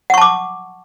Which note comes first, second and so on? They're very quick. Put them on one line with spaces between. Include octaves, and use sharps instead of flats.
F#5 C#6 A5 D6